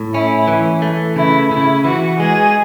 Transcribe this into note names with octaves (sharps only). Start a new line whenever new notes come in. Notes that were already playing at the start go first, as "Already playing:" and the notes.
Already playing: A2
C#4 E4
E3
A3
C#3 E4
C#3 E4
E3 F#4
G#3 G#4